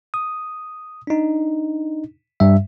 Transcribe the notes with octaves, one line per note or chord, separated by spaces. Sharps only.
D#6
D4 D#4
G2 G3 E5